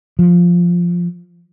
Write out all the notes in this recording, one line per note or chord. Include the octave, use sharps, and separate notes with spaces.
F3